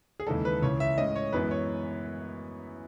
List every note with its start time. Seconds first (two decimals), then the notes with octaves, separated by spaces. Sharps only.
0.20 G#4
0.27 D#2 C#3 E3 G#3 D#4 A4
0.45 B4
0.62 C#2 C#3 E3 C#5
0.80 E5
0.98 A2 G#3 C#4 D#5
1.16 C#5
1.33 F#2 E3 G#3 B3 B4
1.51 C#5